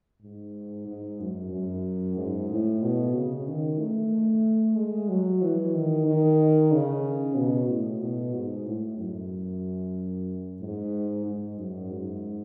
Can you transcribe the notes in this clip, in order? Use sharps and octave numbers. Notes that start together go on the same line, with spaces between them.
G#2
G#2
F#2
F#2
G#2
A2
B2
C#3
D#3
A3
G#3
F#3
E3
D#3
D#3
C#3
B2
A2
B2
G#2
A2
F#2
G#2
G#2
F#2
G#2